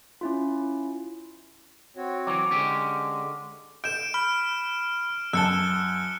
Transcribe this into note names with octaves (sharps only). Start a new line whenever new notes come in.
C#4 E4 F4
C4 F#4 C#5
E3 F#3 D6
D3 G#3 C#4 G4
G6 D7 E7
B5 F6
F#2 A5 E6 F#6 C#7 G7